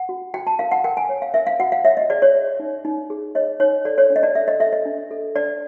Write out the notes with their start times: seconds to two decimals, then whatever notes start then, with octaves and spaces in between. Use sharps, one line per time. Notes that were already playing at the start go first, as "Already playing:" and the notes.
Already playing: F#5
0.09 F#4
0.34 F#4 G5
0.47 A5
0.59 A#4 F5
0.71 F#5
0.84 A#4 G5
0.97 G#5
1.09 C#5
1.22 F5
1.34 A#4 E5
1.47 F5
1.59 F#4 F#5
1.72 F5
1.85 C#5 E5
1.97 D#5
2.10 G#4 D5
2.22 C#5
2.35 G#4
2.60 D#4
2.85 D#4
3.10 G#4
3.35 C#5 D#5
3.60 D#4 C#5
3.85 A4 D5
3.98 C#5
4.10 D4
4.16 D#5
4.23 D5
4.35 A4 E5
4.48 D#5
4.60 A4 E5
4.73 D#5
4.85 D4
5.11 A4
5.36 D4 D5